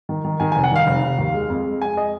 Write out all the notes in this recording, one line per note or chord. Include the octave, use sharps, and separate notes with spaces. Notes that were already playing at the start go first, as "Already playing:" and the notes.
D#3
D#3
D#3 G#5
G#5
F1
F#5
D#3 F5
F1
F1
D#2
G#3
F2
G#3
G#3 G#5
D#5